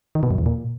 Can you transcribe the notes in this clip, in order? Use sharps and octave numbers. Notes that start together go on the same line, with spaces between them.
D#3
B2
F#2
E2
A#2